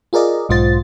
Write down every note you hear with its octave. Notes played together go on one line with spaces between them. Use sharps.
F4 G#4 A#4 D5 D#5
B1 G#2 F4 C5 A6